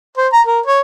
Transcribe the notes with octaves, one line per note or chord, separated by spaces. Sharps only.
C5
A#5
A#4
C#5